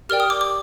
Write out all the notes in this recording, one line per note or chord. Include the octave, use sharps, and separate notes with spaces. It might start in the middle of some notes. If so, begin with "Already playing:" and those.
G4 A#4 D5 G5 F6
D#6
D6
D6